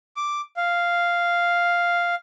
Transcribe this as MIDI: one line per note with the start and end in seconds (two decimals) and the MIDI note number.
0.17 0.41 86
0.57 2.15 77